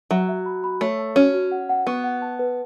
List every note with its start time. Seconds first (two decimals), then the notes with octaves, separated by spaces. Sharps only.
0.11 F#3 E5
0.29 E5
0.46 B5
0.64 B5
0.81 A3 C#5
0.99 A5
1.16 C#4 F#4
1.34 F#4
1.51 F#5
1.69 F#5
1.87 B3 C#6
2.04 F#5
2.22 A5
2.39 B4